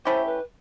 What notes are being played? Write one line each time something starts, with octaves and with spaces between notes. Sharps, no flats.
A3 C#4 E4 G4 C5
B4